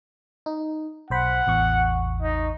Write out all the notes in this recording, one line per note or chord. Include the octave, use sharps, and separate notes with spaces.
D#4
B1 C5 F#5 B5
A1 E2 C#6
D#4